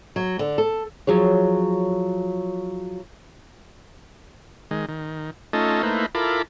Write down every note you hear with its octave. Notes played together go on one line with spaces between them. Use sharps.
F#3
D3
A4
F3 F#3 G#4 C#5
D#3 G#3
D#3
A3 C#4 D#4 F4 A4 D#5
A3 A#3 D#4 E4 B4 C5
E4 F4 A4 A#4 B5 D6